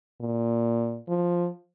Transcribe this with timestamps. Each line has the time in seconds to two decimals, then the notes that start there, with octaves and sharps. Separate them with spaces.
0.21 A#2
1.08 F3